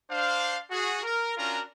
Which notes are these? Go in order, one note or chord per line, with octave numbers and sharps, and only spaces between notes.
D4 C5 F5
F#4 G#4
A#4
C#4 D4 F4 F#4 A#4 A#5